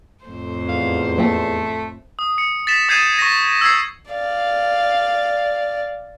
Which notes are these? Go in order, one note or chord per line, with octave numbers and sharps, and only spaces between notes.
F2 A2 C5
E2 F5
F3 A3 A#3 C4
D#6
C#7
A6 B6 E7
D#6 G6 G#6 C7 D#7 E7
C#6 A#6
E6 G#6 C7
D5 F5